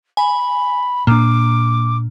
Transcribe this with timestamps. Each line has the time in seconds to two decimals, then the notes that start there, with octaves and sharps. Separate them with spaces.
0.17 G#5 B5
1.07 A#2 A#3 D4 D6